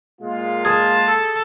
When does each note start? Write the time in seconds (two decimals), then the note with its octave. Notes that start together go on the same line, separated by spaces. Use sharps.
0.21 A#2 G#3 F4
0.65 G#4 A5
1.07 A4